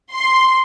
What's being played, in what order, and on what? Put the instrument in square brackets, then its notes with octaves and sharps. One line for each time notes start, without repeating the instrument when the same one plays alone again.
[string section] C6